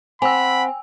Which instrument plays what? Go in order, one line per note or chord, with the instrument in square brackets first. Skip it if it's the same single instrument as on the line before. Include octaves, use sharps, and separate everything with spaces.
[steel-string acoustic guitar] C4 [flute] F#5 [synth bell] G#5 E6 [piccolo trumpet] B5